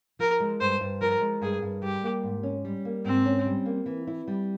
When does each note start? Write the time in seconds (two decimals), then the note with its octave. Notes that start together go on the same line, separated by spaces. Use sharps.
0.19 F3 A#4
0.40 G#3
0.61 G2 C5
0.81 G2
1.01 F3 A#4
1.21 G#3
1.41 G2 G#4
1.62 G2
1.82 G3 G4
2.03 A#3
2.23 G#2
2.43 C#4
2.65 G3
2.85 A#3
3.05 G#2 C4
3.25 C#4
3.46 G3
3.66 A#3
3.86 E3
4.07 E4
4.28 G3